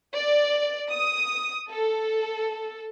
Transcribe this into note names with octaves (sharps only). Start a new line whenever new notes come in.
D5
D#6
A4